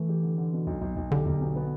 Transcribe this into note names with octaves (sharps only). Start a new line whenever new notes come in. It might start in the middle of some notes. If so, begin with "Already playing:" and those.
Already playing: E3 A3
G4
D3
D3
B2
B1
B1
B1
D3 G4
B1
B2
B3